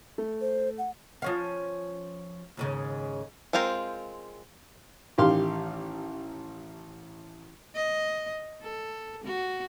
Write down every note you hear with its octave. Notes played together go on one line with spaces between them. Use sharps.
A3
C5
F#5
F3 C#4 F5
D#2 G#2 C#3
G#3 C4 F4 A#4 C5
A1 D#3 G4 F5 C6
D#5
A4
F#4